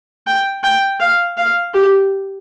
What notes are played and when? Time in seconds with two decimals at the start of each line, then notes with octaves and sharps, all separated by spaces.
0.27 G5
0.64 G5
1.00 F5
1.37 F5
1.74 G4